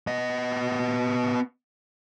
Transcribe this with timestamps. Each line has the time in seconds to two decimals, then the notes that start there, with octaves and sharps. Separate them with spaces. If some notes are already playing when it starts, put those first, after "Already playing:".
0.07 B3 D#5